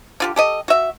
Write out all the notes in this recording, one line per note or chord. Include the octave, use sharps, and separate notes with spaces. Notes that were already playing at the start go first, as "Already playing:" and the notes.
D3 F4 G4
G4 A4 D#5
F#4 E5